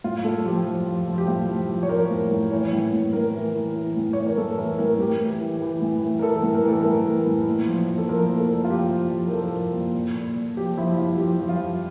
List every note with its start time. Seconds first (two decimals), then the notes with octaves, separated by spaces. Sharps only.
0.04 A2 F4
0.24 A2 A4
0.46 F3 G4
0.65 F3
0.87 F3
1.08 F3
1.18 G4
1.28 A2 F4
1.49 F3
1.69 F3
1.83 C#5
1.89 F3 A#4
2.11 A2
2.31 A2
2.51 E3 C#5
2.72 A2
2.93 A2
3.13 A2 A#4
3.34 E3
3.55 E3
3.76 E3
3.97 A2
4.13 E3 C#5
4.26 A#4
4.37 A2 A4
4.58 E3 A#4
4.78 A2 A#4
4.99 A2 G4
5.20 E3
5.41 E3
5.62 E3
5.82 A2
6.02 E3
6.19 A#4
6.22 E3 A4
6.43 A2
6.55 A#4
6.65 E3 A4
6.81 A2 A#4
7.06 E3
7.26 A2
7.47 A#2
7.67 F3
7.88 F3
7.98 A4
8.09 F3 A#4
8.29 A#2
8.39 A4
8.50 A#2
8.64 F4
8.70 F3 G4
8.91 F3
9.12 F3
9.27 A#4
9.32 F3 A4
9.53 F3
9.74 A#2
9.94 A#2
10.16 A#2
10.36 A#2
10.57 F3 G4
10.77 F3 E4
10.98 F3 F4
11.18 F3 G4
11.39 F3
11.49 F4
11.60 F3